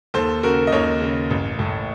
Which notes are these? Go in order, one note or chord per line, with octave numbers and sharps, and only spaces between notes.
D#2 A4 C5
C#3 F#4 A#4
D#5
D#2 A#4 C#5
C#3
A1
A2